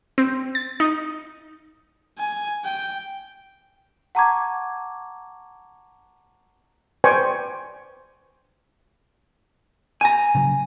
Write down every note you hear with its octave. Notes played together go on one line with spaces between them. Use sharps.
C4
A6
D#4
G#5
G5
F#5 A5 A#5 C#6 D6 G#6
B4 C5 D5 G5 G#5 C#6
G#5 A#5
C#3 F#3